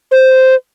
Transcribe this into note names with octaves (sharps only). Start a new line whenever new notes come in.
C5